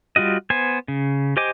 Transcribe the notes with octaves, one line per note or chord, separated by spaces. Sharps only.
G3 F4 F#4 D#5
B3 C5 G#5
C#3
G4 C5 D#5 G#5 D6